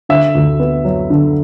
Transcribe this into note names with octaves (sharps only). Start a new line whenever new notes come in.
D3 E5
D2
B3
F#3
D3